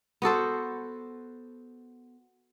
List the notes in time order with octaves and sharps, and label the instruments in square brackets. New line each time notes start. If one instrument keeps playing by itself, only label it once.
[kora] B3 F#4 A4 C5